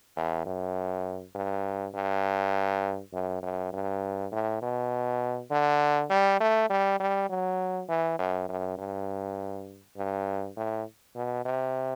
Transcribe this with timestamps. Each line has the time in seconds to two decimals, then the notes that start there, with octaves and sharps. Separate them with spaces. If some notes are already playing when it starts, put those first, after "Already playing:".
0.16 E2
0.46 F#2
1.35 G2
1.94 G2
3.13 F#2
3.43 F#2
3.73 G2
4.32 A2
4.62 B2
5.51 D3
6.10 G3
6.40 A3
6.70 G3
7.00 G3
7.30 F#3
7.89 E3
8.19 F#2
8.49 F#2
8.78 G2
9.96 G2
10.57 A2
11.16 B2
11.45 C3